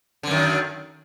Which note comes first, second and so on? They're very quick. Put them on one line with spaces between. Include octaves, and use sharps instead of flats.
D3 F#2 D#3